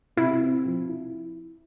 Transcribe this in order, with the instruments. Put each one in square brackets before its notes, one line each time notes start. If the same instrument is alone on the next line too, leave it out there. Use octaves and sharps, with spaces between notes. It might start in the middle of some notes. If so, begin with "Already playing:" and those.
[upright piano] C3 [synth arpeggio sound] E4
[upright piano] C4
F3
E4